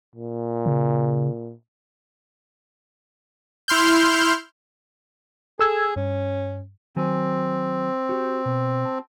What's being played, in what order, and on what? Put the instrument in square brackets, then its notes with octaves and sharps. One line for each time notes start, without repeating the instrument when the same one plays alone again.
[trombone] A#2
[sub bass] C#3
[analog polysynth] E4 C6 F6 G6
[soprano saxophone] G#4 [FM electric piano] A4 E6 G#6
[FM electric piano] G2 [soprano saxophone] C#4
[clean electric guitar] D#3 F#3 G#5 [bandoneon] C4
[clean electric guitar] F#4 G4
B2
A5